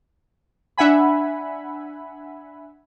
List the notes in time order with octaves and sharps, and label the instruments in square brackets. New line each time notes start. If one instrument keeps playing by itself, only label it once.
[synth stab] D4 E5 F#5 G#5 B5